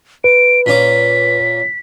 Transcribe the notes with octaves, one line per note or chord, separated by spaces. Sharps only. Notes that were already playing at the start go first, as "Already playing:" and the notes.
B4 D7
A#2 C#4 D6 B6